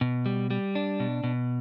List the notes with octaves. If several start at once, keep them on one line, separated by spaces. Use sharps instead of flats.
B2
G3
G3
D4
B2
B2